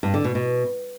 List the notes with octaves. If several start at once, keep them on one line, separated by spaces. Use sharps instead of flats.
G2
D3
B2
B2